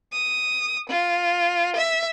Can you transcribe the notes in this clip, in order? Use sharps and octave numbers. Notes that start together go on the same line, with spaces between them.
D#6
F4
E5